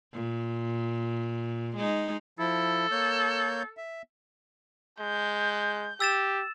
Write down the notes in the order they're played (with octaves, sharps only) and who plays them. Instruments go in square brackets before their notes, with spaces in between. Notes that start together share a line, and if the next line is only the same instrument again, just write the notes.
[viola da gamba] A#2
G#3 D#4
[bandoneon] F3 E4 [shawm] A4
[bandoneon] A#3 C#5 G6
E5
[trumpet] G#3 [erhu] G6
[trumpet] G4 [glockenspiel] E6 A6 E7